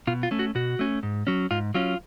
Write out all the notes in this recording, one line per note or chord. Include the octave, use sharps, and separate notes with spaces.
B2 F4
F4
A3 C#4
F#4
B2 F#4
A3 C#4
G#2
F#3 C#4
G#2 F4
F#3 C#4 F4